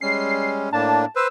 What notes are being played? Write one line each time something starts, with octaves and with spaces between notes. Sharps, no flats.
G3 G#3 C#4 C7
A2 A#3 D4 A5
B4 C5 E6